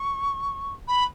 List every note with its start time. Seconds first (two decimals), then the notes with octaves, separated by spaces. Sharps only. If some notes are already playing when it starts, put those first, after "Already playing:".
Already playing: C#6
0.88 B5